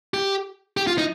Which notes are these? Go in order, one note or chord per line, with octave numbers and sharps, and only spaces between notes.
G4
G4
F4
D#4